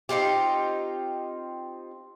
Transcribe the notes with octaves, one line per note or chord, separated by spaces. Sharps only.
C4 D#4 F4 G4